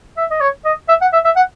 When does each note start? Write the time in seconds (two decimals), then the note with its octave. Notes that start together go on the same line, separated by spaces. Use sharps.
0.17 E5
0.31 D#5
0.41 C#5
0.65 D#5
0.88 E5
1.01 F#5
1.13 E5
1.25 E5
1.36 F#5